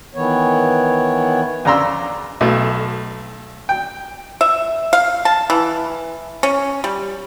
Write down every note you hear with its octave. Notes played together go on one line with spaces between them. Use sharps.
D#3 E3 B3 C#5
F2 C#3 D4 A#5 C6 E6
B1 B2 A3
G5
E5
F5
A5
E3
C#4
G3